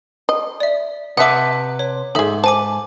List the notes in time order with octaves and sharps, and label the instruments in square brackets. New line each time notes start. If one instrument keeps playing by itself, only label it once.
[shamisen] D#5
[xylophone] D5 E5
[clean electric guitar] C3 B4 A5 [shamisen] D#5 E5 [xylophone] F#5 D6
[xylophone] C#5
[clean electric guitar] D#2 G#2 [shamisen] D#4 G#4 [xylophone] A4 E5
[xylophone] C5 G#5 D6 [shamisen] A5